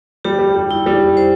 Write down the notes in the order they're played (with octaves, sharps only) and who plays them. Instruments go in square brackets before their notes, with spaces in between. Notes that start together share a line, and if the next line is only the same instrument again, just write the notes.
[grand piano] G3 [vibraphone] G4
[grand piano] G3
G3
[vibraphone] E4
[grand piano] G3
[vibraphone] C5